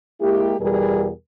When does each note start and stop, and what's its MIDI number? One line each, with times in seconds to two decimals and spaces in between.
0.20 0.54 56
0.20 0.54 58
0.20 0.54 64
0.20 0.54 67
0.60 1.09 40
0.60 1.09 47
0.60 1.09 55
0.60 1.09 68
0.60 1.09 70